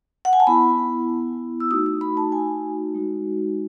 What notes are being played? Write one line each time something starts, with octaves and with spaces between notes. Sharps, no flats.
F#5
G#5
A5
B3 E4 B5
E6
A3 D#4 F#4 D#6
D#6
B5
A5
G#5
G#3 D#4 F#4